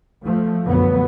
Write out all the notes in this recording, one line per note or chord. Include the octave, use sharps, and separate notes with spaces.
F3 A3
C2 F#2 A#2 D3 F#3 B3